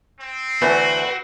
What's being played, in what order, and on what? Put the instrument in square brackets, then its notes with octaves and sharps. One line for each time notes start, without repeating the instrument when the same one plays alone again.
[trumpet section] C4
[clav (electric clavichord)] D2 E3 A3 [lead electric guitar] F#4 [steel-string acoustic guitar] B4